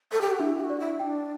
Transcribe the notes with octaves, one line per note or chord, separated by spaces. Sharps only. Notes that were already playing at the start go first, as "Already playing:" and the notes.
A4
G4
F#4
D4 E4
G4
F#4
D5
E4
D4 G5